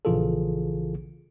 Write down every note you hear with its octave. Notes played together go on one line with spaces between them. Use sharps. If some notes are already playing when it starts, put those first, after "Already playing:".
A#1 C#3 E3 F4 G#4 A4